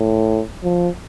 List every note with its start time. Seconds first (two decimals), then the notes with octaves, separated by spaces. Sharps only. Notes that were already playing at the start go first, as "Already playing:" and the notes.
Already playing: A2
0.64 F3